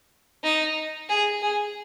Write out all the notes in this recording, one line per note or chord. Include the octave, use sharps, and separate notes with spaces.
D#4
G#4
G#4